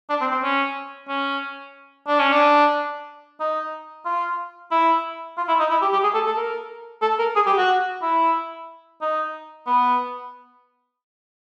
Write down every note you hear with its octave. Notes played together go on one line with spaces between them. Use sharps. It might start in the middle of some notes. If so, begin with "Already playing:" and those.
D4
C4
C4
C#4
C#4
D4
C#4
D4
D#4
F4
E4
F4
E4
D#4
E4
G4
G4
G#4
A4
A4
A#4
A4
A#4
G#4
G4
F#4
E4
D#4
B3